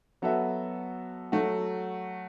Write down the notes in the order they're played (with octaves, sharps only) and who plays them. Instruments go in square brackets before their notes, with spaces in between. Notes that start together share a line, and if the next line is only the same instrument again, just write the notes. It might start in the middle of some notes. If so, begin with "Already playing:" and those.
[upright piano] F#3 B3 F#4 A4 E5
F#3 A3 F#4